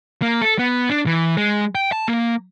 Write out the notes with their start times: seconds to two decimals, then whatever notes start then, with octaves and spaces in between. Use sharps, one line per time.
0.22 A#3
0.42 A4
0.59 B3
0.90 D4
1.06 E3
1.37 G#3
1.75 G5
1.92 A5
2.08 A#3